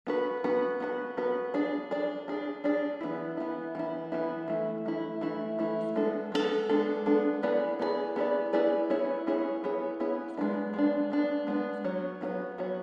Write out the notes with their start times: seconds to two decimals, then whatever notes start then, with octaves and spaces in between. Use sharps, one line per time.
0.07 B3 F#4 B4
0.44 B3 F#4 B4
0.80 B3 F#4 B4
1.17 B3 F#4 B4
1.54 D4 G#4 D5
1.91 D4 G#4 D5
2.28 D4 G#4 D5
2.64 D4 G#4 D5
3.01 E3 B3 E4
3.37 E3 B3 E4
3.75 E3 B3 E4
4.12 E3 B3 E4
4.48 E3 A3 E4
4.86 E3 A3 E4
5.21 E3 A3 E4
5.59 E3 A3 E4
5.95 G#3 B3 D4 A4
6.32 G#3 B3 D4 A4
6.69 G#3 B3 D4 A4
7.06 G#3 B3 D4 A4
7.42 B3 E4 G#4 B4 D5
7.79 B3 E4 G#4 B4 D5
8.16 B3 E4 G#4 B4 D5
8.53 B3 E4 G#4 B4 D5
8.90 B3 E4 G#4 C#5
9.27 B3 E4 G#4 C#5
9.64 B3 E4 G#4 C#5
10.00 B3 E4 G#4 C#5
10.37 G#3 B3 D4
10.74 G#3 B3 D4
11.10 G#3 B3 D4
11.47 G#3 B3 D4
11.84 F#3 B3 F#4 C#5
12.21 F#3 B3 F#4 C#5
12.58 F#3 B3 F#4 C#5